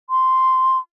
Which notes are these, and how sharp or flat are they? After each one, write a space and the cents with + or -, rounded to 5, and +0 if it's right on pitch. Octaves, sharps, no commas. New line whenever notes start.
C6 -5